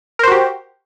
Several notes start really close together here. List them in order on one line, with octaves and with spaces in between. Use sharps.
A#4 C5 F#4 G4